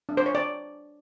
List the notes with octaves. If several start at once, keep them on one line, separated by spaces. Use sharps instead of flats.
D4
C5
C#5
D5